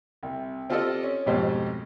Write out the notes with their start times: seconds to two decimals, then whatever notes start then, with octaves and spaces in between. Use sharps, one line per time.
0.23 C2
0.70 C4 F4 G4 A4 D5 D#5
1.03 C#4
1.26 F2 G#2 B2 A3 G4 C5